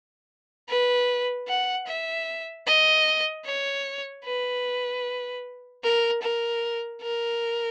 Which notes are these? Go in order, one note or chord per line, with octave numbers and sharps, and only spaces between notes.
B4
F#5
E5
D#5
C#5
B4
A#4
A#4
A#4